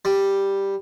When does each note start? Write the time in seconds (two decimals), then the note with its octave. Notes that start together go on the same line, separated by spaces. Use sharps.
0.05 G3